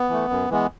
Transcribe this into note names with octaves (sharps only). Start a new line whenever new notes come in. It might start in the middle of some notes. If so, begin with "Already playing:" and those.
Already playing: B3
E3 A3
F#2
E3 G#3 B3